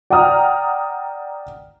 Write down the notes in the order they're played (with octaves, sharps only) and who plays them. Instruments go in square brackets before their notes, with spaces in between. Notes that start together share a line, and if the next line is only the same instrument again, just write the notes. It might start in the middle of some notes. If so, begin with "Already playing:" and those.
[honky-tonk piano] D5 F#5 G5 A#5 D#6 F6